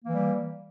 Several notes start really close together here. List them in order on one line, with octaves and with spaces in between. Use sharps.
A#3 E3 G3